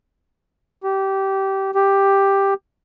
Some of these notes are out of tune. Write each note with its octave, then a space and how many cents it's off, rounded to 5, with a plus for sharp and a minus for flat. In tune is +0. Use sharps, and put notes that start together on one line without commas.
G4 -20
G4 +5